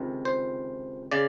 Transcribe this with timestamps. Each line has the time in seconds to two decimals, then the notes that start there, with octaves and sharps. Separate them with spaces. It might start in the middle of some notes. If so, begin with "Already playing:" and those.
Already playing: C#2 C3 D#3
0.25 C5
1.12 C#3 D5